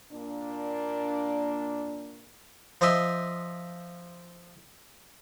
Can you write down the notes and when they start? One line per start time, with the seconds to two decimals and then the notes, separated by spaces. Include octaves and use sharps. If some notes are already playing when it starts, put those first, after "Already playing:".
0.11 A#2 A#3 D4
2.81 F3 C5 D#5 E5 C6